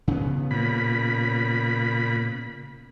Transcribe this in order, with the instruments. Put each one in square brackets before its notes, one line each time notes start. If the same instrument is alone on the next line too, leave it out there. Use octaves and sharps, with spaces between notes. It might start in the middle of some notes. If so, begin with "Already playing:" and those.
[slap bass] C#3 B3
[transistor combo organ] A#2 B5